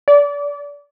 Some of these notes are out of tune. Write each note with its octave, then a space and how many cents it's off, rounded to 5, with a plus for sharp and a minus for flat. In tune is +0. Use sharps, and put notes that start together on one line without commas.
D5 -30